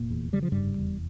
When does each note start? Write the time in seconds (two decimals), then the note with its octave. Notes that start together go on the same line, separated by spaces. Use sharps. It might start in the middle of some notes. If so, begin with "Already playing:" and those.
Already playing: F1 A#2 A#3
0.11 E2
0.33 C#3 G3
0.43 F3
0.52 F1 G2 G3
0.78 E2